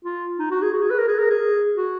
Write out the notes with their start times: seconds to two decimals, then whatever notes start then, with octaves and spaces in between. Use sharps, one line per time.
0.05 F4
0.39 D#4
0.51 F#4
0.62 G#4
0.73 F#4
0.81 G#4
0.90 B4
0.99 A#4
1.08 G#4
1.19 A#4
1.30 G#4
1.76 F#4